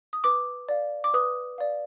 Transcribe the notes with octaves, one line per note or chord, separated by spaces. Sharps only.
D#6
B4 D6
D5 F5
D6
B4 D#6
D5 F5